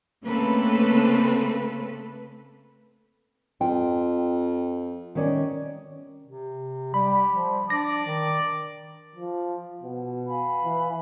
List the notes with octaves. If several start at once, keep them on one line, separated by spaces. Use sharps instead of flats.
C#3 A3 A#3 C4 A4 B4
F2 G5
D#3 C#4 D5
C3
G3 G4 B5
F3
D4 D5 A#6
D#3
F3
B2
F5 G#5 B5
E3